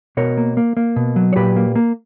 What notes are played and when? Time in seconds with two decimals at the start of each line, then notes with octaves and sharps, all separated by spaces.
0.17 B2 A#4 C#5
0.37 A#3
0.57 A#3
0.77 A#3
0.96 B2
1.16 F#3
1.33 C#5
1.36 A#2 G4 B4
1.56 A#3
1.75 A#3